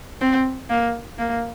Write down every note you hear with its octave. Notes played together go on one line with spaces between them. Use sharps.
C4
A#3
A#3